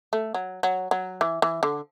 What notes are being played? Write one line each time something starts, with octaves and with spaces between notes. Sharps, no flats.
A3
F#3
F#3
F#3
E3
E3
D3